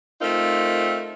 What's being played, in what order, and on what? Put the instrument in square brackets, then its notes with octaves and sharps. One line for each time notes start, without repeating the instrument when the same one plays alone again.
[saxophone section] A3 C4 D#4 F4 A#4